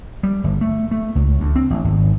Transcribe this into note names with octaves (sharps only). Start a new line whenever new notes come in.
G3
G1
A3
A3
C#2
D2
C4
A1
G#1